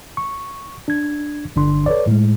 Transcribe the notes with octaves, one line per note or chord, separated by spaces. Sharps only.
C#6
D4 G#6
G1 D3 D4 C6
A4 B4 C#5 D5
A2 G#3